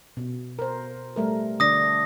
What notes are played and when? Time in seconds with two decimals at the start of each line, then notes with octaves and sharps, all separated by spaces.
0.17 B2
0.59 A#4 C5
1.16 G3 A3 A#4
1.60 D3 D4 D5 D#6 A#6